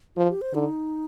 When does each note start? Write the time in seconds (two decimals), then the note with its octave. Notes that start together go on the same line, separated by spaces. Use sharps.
0.16 F3 F4
0.29 G4
0.41 C5
0.54 D3 D#4